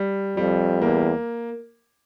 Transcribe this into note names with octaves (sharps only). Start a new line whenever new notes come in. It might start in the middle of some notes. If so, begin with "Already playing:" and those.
Already playing: G3
F2 G3
E2 A#3